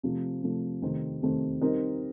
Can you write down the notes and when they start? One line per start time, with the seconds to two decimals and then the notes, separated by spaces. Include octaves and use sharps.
0.03 C3 F3 A3
0.42 C3 F3 A3
0.82 C3 D#3 A3 C4
1.22 C3 D#3 A3 C4
1.61 G3 C4 D#4 A#4